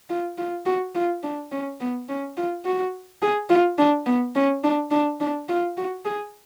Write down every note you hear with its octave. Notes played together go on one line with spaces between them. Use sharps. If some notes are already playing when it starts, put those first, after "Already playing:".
F4
F4
F#4
F4
D4
C#4
B3
C#4
F4
F#4
G#4
F4
D4
B3
C#4
D4
D4
D4
F4
F#4
G#4